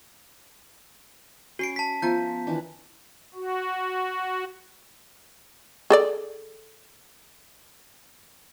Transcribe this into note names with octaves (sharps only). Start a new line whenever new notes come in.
C#4 F#4 C7 D7
A5 B6
F3 B3 A#5 G6
D#3 E3 D4
F#4
G#4 A4 D5